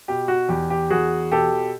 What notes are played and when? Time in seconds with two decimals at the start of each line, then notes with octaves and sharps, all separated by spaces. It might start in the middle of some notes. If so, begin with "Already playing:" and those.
0.08 B2 G4
0.28 F#4
0.49 E2 G4
0.70 G4
0.90 E2 F#4 G#4
1.31 B2 G4 A4